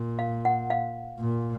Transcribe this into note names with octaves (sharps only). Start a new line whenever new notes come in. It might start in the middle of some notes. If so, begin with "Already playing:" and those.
Already playing: A#2
F5
F#5
F5
A#2